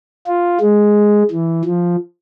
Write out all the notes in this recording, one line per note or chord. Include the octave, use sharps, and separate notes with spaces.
F4
G#3
E3
F3